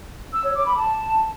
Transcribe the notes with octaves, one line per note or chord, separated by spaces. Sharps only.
E6
C#5
D6
B5
A5